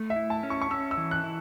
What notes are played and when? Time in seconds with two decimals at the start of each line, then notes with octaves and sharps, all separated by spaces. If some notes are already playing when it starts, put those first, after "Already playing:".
Already playing: A3
0.10 E5
0.16 E4
0.30 A5
0.43 C#4
0.50 C#6
0.62 C#6
0.71 C#4 E6
0.91 E6
0.97 E3
1.11 F#6
1.24 E4